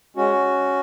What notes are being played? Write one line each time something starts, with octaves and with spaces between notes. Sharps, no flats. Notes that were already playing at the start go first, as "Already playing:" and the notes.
G#3 C#4 F#4